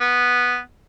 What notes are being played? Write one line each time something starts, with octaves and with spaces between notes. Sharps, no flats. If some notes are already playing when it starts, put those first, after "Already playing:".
B3